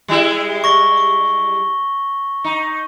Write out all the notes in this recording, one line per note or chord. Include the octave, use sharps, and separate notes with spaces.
G3 G#3 E4
C#6 A#6 G7
C#6
D#4